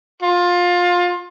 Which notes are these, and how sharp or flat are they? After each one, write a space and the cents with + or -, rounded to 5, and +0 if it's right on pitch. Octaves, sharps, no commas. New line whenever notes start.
F4 +20